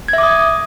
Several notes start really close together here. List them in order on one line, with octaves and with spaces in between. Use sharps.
G#6 E5 D6 D#6